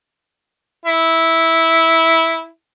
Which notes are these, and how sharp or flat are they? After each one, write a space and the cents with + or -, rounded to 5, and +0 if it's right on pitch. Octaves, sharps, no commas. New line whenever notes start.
E4 -10